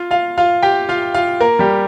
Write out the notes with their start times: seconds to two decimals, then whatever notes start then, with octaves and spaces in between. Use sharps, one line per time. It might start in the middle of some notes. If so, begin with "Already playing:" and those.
Already playing: F4 F5
0.11 F4 F5
0.38 F4 F5
0.63 G4 G5
0.89 F4 F5
1.14 F4 F5
1.40 A#3 A#4
1.59 G3 G4